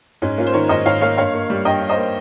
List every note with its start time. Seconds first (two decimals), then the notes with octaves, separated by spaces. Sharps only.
0.22 G#2 C#4
0.38 A#3 C#4 F4
0.47 C5
0.54 D#3 A#4 C#5
0.69 G#2 C5 D#5
0.85 G#2 C#5 F5
1.01 A#3 C#5 F5
1.17 G2 C#5 F5
1.34 A#3
1.50 G3
1.65 G2 D#5 G5
1.81 G2
1.89 C5 D#5
1.97 A#3